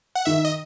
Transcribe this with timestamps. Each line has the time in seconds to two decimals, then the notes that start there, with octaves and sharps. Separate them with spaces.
0.15 F#5
0.25 D#3 E5
0.45 D#5